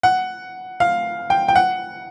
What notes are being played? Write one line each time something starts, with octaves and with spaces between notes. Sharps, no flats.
F#5
F5
G5
G5
F#5